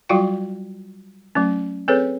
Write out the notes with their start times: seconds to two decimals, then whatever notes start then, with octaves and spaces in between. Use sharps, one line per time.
0.09 F#3 G3 F4 F#4 F5 G5
1.35 F#3 A3 C#4
1.88 C4 G#4 A4 B4 C#5